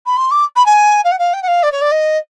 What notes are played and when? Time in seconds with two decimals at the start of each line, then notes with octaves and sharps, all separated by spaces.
0.06 B5
0.17 C6
0.31 D6
0.55 B5
0.66 G#5
1.04 F5
1.11 F#5
1.19 F5
1.33 G5
1.42 F#5
1.47 F5
1.62 D5
1.72 C#5
1.81 D5
1.91 D#5